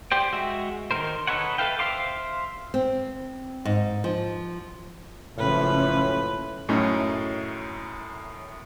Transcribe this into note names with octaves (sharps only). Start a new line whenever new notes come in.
G4 C5 D5 G5
G#3 F#4 E5
D#3 G3 D#4 A#4 C5
D#4 A4 B4 C#5 F#5
A4 B4 E5 F5 G5
C5 E5 F5 C6 D6
C4
G#2
F3
F#1 A2 F3 C#4 B4
F#2 A2 A3 C#4 D#4